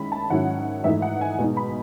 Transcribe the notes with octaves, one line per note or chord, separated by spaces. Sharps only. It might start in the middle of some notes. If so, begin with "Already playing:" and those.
Already playing: D#3 G#3 C#4 E4 B5
A5
G#2 D#3 F#3 C#4 E4 F#5
G#2 E3 A3 D#4 E5
F#5
G#5
B2 G#3 D#4
B5